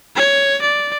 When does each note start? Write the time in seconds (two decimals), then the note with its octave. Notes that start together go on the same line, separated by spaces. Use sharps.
0.16 C#5
0.62 D5